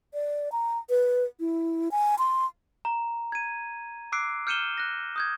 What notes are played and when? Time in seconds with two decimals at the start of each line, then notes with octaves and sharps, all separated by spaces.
0.14 D5
0.52 A#5
0.90 B4
1.40 E4
1.91 G#5
2.18 C6
2.85 A#5
3.32 G#6 D#7
4.12 D6 E6 F#6 C7 D7
4.47 F6 G6 C#7 D#7 E7 G7
4.78 F#6 A#6
5.16 D#6 G6 G#6